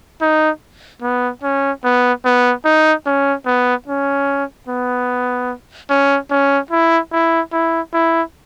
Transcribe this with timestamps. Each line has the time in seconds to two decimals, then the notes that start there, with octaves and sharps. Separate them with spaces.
0.22 D#4
1.02 B3
1.43 C#4
1.84 B3
2.25 B3
2.65 D#4
3.06 C#4
3.46 B3
3.87 C#4
4.68 B3
5.90 C#4
6.31 C#4
6.71 E4
7.12 E4
7.53 E4
7.94 E4